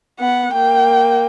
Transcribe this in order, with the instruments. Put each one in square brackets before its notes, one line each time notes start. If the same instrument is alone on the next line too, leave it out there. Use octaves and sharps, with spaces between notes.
[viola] B3 [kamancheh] F#5
[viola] A#3 [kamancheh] G5